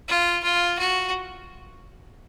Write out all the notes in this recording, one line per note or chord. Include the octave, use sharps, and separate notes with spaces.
F4
F4
F#4